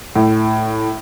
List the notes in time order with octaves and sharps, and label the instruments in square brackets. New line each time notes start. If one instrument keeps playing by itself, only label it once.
[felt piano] A2